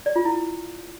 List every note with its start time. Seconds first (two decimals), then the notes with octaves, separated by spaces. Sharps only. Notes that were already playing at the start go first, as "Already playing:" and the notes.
0.06 D5
0.16 F4
0.25 E4